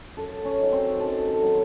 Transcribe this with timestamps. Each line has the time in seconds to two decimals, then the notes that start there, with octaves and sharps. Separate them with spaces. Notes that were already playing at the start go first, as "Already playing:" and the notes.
0.17 F#2 A4
0.45 C#4
0.59 D#3 F#3
0.73 C4
1.00 F#2 A4
1.28 A4
1.42 D#3 F#3